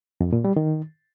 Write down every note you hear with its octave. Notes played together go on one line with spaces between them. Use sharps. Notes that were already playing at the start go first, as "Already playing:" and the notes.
F2
A#2
G3
D#3